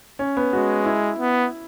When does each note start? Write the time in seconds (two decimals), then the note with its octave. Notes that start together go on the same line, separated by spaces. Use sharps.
0.19 C#4
0.37 B3
0.53 G#3 F#4
0.85 E4
1.18 B3